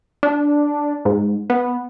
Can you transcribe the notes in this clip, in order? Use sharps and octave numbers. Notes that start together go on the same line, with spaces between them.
D4
G#2
B3